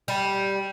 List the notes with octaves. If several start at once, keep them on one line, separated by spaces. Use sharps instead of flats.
G3